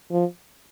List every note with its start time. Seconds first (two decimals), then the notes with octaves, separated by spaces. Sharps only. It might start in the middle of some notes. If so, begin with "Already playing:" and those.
0.11 F3